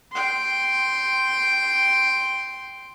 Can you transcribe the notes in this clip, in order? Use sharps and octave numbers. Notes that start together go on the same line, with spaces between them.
G5 C6